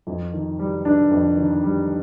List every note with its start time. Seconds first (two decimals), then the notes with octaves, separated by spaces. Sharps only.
0.07 F2
0.33 D#3
0.59 G3
0.85 D4
1.11 F2
1.37 D#3
1.64 G3